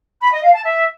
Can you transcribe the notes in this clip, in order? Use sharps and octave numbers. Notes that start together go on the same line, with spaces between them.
B5
D#5
F5
A5
E5